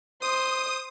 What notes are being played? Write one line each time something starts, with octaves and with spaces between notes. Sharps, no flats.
C5 D#6